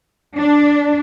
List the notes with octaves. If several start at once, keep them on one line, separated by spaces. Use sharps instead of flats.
D4